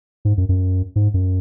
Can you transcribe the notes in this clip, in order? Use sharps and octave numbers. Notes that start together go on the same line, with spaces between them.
G#2
F#2
F#2
G#2
F#2